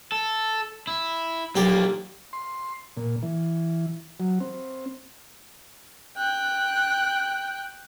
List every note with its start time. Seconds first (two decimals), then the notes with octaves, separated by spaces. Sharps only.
0.12 A4
0.87 E4
1.56 B1 F3 A#3 G4 D5
2.33 C6
2.97 A#2
3.23 E3
4.20 F#3
4.41 C4
6.17 G5 F#6